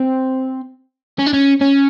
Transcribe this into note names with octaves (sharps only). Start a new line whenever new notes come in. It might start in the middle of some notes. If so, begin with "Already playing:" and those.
Already playing: C4
C#4
D4
C#4
C#4